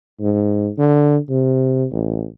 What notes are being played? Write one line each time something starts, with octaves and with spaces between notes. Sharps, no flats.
G#2
D3
C3
A1